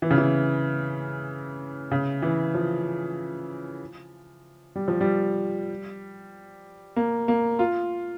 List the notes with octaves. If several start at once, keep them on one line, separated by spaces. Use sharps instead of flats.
E3
C#3
E3
C#3
E3
F3
G3
F3
G3
A#3
A#3
F4